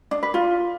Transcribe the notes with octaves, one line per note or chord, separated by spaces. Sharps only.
D4
B4
F4